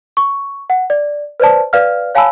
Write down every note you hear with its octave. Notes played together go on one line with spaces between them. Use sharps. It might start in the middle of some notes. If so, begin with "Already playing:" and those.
C#6
F#5
D5
B4 C5 D5 A5
B4 D5 F5 F6
C#5 F5 G#5 A5 B5 E6